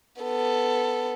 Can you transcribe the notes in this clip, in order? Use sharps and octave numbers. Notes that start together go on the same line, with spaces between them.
B3 A4